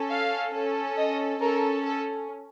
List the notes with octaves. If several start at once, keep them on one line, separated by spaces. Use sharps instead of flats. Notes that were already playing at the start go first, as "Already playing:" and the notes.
Already playing: C#4 A4
F5
C#4 A4
D#5
C#4 A4 A#4
A4